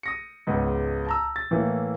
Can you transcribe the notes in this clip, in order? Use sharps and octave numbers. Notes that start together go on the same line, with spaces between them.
D#6 A#6 C#7
C#2 G#2 B3 F#5
A5 A#5 E6
A6
A2 E3 A#3